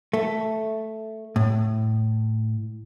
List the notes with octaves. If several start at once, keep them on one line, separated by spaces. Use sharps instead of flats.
A3
A2